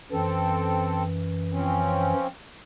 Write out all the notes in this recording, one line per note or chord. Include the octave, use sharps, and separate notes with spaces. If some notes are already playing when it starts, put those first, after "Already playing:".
F#2 E3 C4 A4
F3 C4 C#4